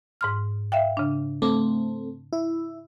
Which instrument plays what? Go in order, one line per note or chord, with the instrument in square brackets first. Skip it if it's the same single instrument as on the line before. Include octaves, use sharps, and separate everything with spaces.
[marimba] G#2 C6 F6
E5 F5 G5
C#3 D4
[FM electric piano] A3 C4 [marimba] D6
[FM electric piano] E4